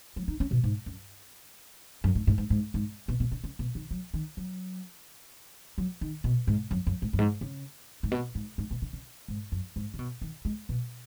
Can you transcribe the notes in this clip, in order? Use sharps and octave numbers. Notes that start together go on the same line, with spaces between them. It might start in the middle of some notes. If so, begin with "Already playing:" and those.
F#3
D#4
C#4
B2
G#2
F#2
F#2
G#2
G#2
G#2
G#2
G#2
B2
B2
C#3
C#3
B2
D#3
F#3
D#3
F#3
F#3
D#3
B2
G#2
F#2
F#2
G#2
F#2
G#2
C#3
G#2
B2
G#2
G#2
B2
C#3
C#3
G#2
F#2
G#2
C#3
B2
D#3
G#3
B2